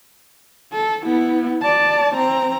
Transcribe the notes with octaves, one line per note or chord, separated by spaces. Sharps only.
A4
B3 E4
D5 A5
C4 A#5